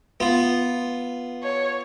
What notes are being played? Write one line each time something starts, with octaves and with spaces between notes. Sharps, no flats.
B3 F4
C#5